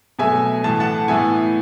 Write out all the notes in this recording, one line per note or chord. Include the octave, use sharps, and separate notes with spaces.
B2 F#3 A3 E5 G#5
A2 E3 A3 A5
F#5 A5
A2 E3 B3 E5 G#5